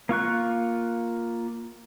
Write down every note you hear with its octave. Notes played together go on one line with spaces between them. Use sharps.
A#3 F4 C#6 F#6